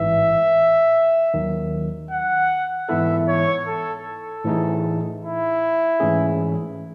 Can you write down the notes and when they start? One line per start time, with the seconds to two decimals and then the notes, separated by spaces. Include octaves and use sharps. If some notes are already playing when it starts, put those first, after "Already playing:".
Already playing: A1 G#2 E3 E5
1.34 D#2 D#3 F#3
2.11 F#5
2.89 G#2 E3 B3 E4 A4 E5
3.28 C#5
3.67 A4
4.06 A4
4.44 A2 E3 A3 D#4 G#4
5.23 E4
6.00 G#2 E3 A3 C#4 G#4